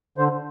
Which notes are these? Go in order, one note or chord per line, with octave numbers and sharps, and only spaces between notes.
D3 C5